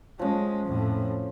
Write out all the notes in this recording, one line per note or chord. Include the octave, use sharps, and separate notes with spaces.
F3 G#3 C#4
F2 A2